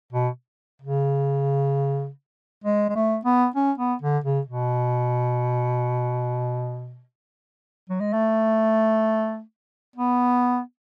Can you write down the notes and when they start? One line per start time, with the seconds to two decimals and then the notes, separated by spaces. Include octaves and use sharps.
0.13 B2
0.82 C#3
2.64 G#3
2.90 G#3
2.96 A3
3.25 B3
3.56 C#4
3.78 B3
4.02 D3
4.24 C#3
4.47 B2
7.90 F#3
8.01 G#3
8.13 A3
9.96 B3